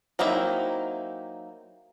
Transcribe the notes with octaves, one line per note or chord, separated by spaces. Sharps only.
F#3 A#3 C4 D#4 E4